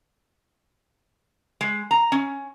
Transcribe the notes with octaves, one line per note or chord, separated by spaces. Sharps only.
G#3
A#5
C#4